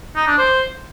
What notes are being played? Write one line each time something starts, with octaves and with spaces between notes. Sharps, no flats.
D#4
D4
C5